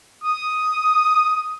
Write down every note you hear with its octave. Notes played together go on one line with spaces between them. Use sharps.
D#6